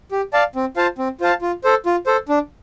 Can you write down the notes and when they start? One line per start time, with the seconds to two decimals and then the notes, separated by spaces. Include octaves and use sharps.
0.11 G4
0.33 D5 F5 A5
0.55 C4
0.76 F4 C5 F5 A5
0.98 C4
1.21 F4 C5 F5 A5
1.42 F4
1.64 A4 C5
1.86 F4
2.06 A4 C5
2.29 D4